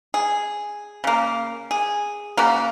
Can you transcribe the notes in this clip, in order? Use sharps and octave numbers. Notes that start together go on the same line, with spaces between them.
G#4
C#3 A#3
G#4
C#3 A#3 F#4